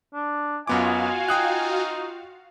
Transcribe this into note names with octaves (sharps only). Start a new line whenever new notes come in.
D4
F#2 B3 F4 F#4 D#5 F5 G#5 D6
D#4 G5 D#6 F#6